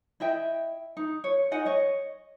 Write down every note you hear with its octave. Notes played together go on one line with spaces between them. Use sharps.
E4 D#5 E5 G5
D#4
C#5
D#4 D#5 F#5 G#5
C#5 D#5